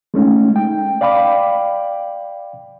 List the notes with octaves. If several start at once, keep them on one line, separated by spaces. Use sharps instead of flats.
G#3 A3 C#4 D#4
G5
D5 F5 G5 B5 D6